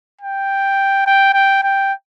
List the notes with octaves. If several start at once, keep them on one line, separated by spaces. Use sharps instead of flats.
G5
G5
G5
G5